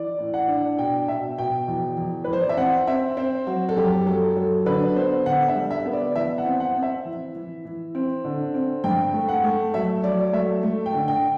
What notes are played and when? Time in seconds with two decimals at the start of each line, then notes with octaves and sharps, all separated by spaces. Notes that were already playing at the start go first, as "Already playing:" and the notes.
Already playing: E3 D5
0.19 A2
0.34 F#5
0.48 D4
0.78 B2 G5
1.08 B2 E5
1.38 B2 G5
1.68 E2
1.97 E2
2.24 E2 B4
2.33 C5
2.41 D5
2.49 E5
2.57 C4 F#5
2.87 C4 E5
3.17 C4 C5
3.47 F#3 F#4
3.69 A4
3.76 F#2 G4
4.06 F#3 A4
4.36 F#3 A4
4.66 D3 B4
4.96 B3 C5
5.26 D3 F#5
5.48 E5
5.55 G3
5.71 E5
5.86 B3
5.93 D5
6.15 E3 E5
6.38 F#5
6.46 C4
6.60 F#5
6.75 C4
6.83 E5
7.05 E3
7.35 E3
7.65 E3
7.95 C4
8.25 D3
8.54 C4
8.84 G2 G5
9.14 A3
9.29 F#5
9.44 A3
9.74 F#3 E5
10.04 F#3 D5
10.33 A3 E5
10.63 A3
10.86 G5
10.93 D3
11.08 G5